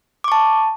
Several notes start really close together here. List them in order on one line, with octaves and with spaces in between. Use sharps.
D6 C#6 A5